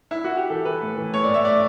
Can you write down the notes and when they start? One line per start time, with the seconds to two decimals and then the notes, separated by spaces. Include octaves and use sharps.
0.11 E4
0.24 F#4
0.37 G4
0.50 E3 A4
0.65 E3 B4
0.82 A2
0.97 E3
1.14 A2 C#5
1.24 D5
1.29 A2
1.34 E5
1.45 A2 D5